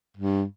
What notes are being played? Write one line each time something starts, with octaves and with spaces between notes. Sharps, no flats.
G2